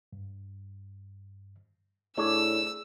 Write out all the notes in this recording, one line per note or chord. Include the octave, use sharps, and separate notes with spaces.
G2
A2 D4 G#4 C#5 E6